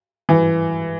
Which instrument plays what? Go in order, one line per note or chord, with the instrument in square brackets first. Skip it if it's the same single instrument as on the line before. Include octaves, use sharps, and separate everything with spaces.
[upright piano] E3